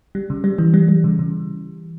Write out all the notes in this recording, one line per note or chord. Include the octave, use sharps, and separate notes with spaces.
G3
C#3
G3
E3
G3
G3
C#3
C#3